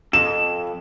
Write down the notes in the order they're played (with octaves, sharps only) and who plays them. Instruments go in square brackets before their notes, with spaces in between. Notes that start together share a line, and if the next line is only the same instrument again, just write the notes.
[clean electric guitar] F2 [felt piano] E7